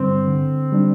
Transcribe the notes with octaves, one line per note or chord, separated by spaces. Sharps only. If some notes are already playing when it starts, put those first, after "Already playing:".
Already playing: G2 D3 G3 C4
D3
G3 D4